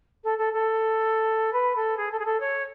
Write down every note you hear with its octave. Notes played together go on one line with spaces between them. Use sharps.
A4
A4
A4
B4
A4
G#4
A4
G#4
A4
C#5